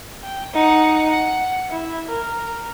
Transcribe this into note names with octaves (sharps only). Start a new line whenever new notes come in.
G5
D#4 F#5
F#5
E4
A#4